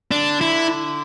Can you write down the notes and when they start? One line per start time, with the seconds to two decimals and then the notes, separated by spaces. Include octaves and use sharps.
0.11 D3 D4
0.41 E4